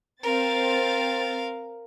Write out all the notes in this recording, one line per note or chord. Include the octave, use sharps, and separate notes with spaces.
C4 A#4 F5 A6